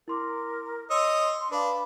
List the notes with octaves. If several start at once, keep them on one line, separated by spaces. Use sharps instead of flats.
E4 A#4 C6 D6
C#5 D#5 C6 E6
D4 B4 F5 B5